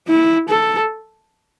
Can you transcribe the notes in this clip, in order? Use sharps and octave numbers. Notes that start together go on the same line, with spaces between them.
E4
A4